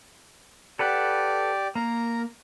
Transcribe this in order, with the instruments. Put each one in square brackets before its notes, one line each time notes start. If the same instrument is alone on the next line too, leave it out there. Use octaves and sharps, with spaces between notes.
[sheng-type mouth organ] G4 D5 [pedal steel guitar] A4 B4 F#5
[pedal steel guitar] A#3 [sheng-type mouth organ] A#4 A#5